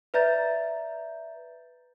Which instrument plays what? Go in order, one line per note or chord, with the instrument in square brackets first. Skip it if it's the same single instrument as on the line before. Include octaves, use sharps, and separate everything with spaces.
[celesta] B4 D5 E5 A#5 G6 A6